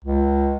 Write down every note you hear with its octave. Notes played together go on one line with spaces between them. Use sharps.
C#2